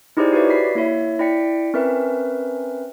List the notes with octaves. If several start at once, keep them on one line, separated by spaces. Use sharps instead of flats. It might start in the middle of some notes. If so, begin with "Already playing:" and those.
D#4 E4 G4 G#4 C5 D5
F#4 G4 B4 C#5 D5 E5
B5 B6 C7
A#3 E4 C#5 E5
E4 D5 G5 B6 C#7
C4 C#4 A#4 B4 E5